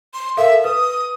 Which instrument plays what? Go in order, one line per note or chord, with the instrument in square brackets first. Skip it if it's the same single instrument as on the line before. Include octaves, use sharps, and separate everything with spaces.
[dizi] C6
[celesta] A4 A#4 F5 [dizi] E5
[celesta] B4 [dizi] D#6